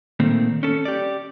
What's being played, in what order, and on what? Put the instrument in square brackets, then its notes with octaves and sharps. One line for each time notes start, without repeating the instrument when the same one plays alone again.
[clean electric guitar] A#2 D#3 A3 A#3 C4
C#4 A4
G4 D5